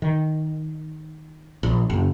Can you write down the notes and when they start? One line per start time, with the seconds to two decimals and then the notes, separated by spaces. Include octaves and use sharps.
0.02 D#3
1.63 A#1
1.90 F#1